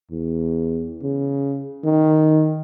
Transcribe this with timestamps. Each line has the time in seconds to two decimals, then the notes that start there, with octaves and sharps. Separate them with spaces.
0.11 E2
1.03 C#3
1.84 D#3